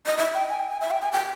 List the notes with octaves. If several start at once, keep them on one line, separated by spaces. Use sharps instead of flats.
D#5
E5
G5
G#5
G5
G#5
E5
G5
G#5
G5